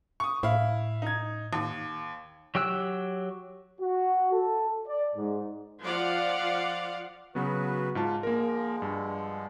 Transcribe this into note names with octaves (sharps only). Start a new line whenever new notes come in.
C#6 D#6
A2 E4 F5
D#4 G#6
D#2
F#3 G4 G5 E6 F#6
F#4
A4
D5
G#2
F3 F4 D5 F5 F#5
C#3 F#3 B3 F#4 B4
G#2 F4 A5
D3 F3 G#3 A#3 A#4
G2